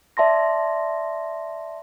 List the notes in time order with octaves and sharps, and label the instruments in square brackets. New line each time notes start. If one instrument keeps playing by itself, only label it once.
[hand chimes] D5 E5 A5 C6 A#6